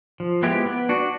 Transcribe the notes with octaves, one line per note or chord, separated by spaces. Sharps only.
F3
G#3 B3 E4 G4
B3
D4 F#4